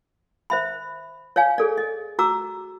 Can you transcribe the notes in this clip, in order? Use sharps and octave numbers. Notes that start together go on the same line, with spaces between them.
C5 E5 B5
C#5 D5 F5 G#5
G#4 A4 D5
D#5
F#4 A#5 D6 E6